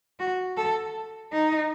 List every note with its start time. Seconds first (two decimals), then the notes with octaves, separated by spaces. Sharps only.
0.19 F#4
0.57 A4
1.33 D#4